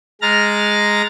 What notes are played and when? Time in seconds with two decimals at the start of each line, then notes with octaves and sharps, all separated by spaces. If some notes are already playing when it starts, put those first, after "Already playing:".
0.22 G#3 A#5 F6 A6 A#6